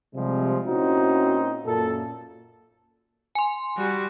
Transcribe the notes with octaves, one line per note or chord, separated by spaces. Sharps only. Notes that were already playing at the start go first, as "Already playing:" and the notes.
C3 F3 G3 G#3
A#2 C4 C#4 D#4 E4 F#4
F#2 A#2 A4
G#5 C6
G3 F#4